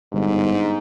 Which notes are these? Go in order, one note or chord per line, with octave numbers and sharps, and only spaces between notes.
G1 G#2